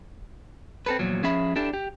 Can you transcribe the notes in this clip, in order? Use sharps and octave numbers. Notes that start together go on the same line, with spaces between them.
C4 A4 B4
E2 A#2 F3 F#3
F3 C#4 G#4 E5 B5
D4 E4 G4 A4
G4